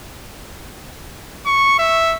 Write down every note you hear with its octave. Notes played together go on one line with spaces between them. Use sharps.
C#6
E5